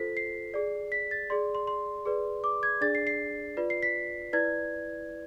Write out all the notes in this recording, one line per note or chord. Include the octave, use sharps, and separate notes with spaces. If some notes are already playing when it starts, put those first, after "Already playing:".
Already playing: F4 A4 C5 B6
C7
G#4 D5
B6
A6
G#4 D5 C6
C6
C6
G#4 B4 D5
D6
G#6
D4 G#4 D5 A6
C7
C7
F4 B4 D5
C7
B6
E4 B4 D5 G#6